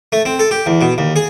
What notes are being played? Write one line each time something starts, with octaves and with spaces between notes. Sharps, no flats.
A3
C4
A4
G4
E2
B2
D#2
G#4